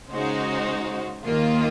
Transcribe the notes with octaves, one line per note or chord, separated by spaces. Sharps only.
C#3 G#3 D#4 F#4 C5
D#2 D#3 A#3 F4